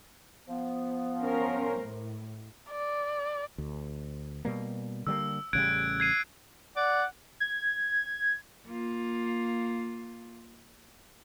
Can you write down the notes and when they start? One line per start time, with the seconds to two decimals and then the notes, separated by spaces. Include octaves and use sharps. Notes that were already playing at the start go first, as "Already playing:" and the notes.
0.48 F3 B3
1.21 C#4 A#4 C5
1.77 A2
2.72 D5
3.58 D2
4.45 B2 G3 A#3
5.07 D3 G3 A#3 E6
5.53 A1 C#3 G3 F#6 G#6 D7
6.00 G#6 C7 D#7
6.77 D5 F#5
7.40 G#6
8.66 A#3 F4